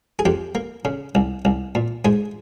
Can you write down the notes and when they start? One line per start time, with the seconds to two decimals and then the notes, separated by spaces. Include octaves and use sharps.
0.19 G#4
0.25 F2 G4
0.55 A#3
0.85 C#3
1.15 C2
1.45 C2
1.75 A#2
2.05 G#2 G#4